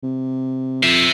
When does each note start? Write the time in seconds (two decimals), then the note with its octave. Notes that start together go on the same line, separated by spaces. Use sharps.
0.03 C3
0.83 F2 C5 E5